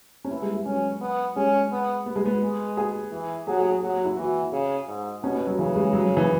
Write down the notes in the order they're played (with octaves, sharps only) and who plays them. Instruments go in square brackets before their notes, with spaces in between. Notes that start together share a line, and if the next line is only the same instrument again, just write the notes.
[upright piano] C#4
[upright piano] B3 [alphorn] E4
[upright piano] G#3
G#3
[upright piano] F#3 [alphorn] C#4
[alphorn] B3
[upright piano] G#3 [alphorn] C#4
[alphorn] B3
[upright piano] B3
G#3
B3
[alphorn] G#3
[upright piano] G#4
[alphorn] E3
[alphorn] F#3 [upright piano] G#4
[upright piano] G#4
G#4
[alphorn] F#3 [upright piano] G#4
[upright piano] F#4
E4
[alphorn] E3 [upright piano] F#4
[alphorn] C#3
G#2
[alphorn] B2 [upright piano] C#4
[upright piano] B3
F#3
[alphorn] C#3 [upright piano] E3
[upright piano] G#3
F#3
F#3
E3